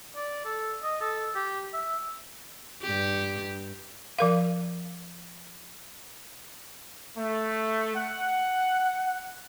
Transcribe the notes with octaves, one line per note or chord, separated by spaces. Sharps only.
D5
A4
D#5
A4
G4
E5
G2 G4
F3 A#4 F5
A3
F#5